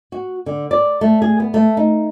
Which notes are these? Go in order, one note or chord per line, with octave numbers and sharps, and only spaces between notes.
F#4
D3
D5
A3
G#4
B3
A3
D#4